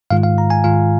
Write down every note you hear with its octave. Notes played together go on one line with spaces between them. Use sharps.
G#2 D#3 G#3 F4 F5
F5
A#5
G#5
G#2 D#3 G#3 F4 F5